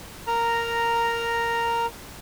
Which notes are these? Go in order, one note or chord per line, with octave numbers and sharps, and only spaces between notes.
A#4 A#5